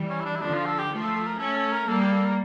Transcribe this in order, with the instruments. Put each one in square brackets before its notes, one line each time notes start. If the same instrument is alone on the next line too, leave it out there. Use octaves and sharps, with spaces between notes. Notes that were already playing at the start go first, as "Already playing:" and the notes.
Already playing: [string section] E3 G3
[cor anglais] C#4
E4
D4
E4
[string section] D3 F3 [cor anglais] D4
[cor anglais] F4
A4
G4
[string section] F3 A3
[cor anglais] A4
A4
A#4
[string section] A3 C#4 [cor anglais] A4
[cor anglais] A4
A#4
[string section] G3 A#3 [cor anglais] A4
[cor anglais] G4
A4
A#4